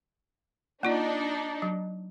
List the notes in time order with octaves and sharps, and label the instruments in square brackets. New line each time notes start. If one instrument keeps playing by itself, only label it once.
[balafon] A#3 F4 D5 [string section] D4 D#4
[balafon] F#3